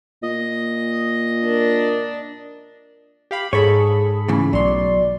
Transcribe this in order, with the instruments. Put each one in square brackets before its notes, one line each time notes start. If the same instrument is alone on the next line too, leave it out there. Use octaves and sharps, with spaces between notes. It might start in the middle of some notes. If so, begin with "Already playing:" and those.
[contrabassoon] A#2 [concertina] D#5
[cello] D4 [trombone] A#4
[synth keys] G4 F5 B5
[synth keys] G#2 A4 B5 [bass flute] G#4 [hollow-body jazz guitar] C#5
[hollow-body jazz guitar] A2 C#3 E3
[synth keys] B1 C6 [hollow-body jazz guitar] F#3 [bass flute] D5